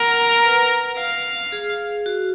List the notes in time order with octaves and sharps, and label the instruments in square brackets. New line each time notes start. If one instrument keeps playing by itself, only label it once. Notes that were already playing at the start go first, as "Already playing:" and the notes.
Already playing: [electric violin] A#4 [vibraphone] F#5
[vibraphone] B4
[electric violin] F5
[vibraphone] G#4
F#4